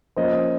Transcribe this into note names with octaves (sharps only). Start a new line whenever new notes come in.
F3 A#3 C#4 C5 D#5